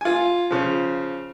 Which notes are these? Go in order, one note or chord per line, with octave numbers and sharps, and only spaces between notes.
F4 G#5
C#3 F3